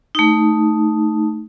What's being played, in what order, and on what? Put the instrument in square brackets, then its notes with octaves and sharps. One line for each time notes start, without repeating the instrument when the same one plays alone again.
[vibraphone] A3 D#4